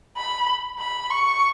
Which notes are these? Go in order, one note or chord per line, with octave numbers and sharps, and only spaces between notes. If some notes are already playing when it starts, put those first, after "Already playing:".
B5
B5
C#6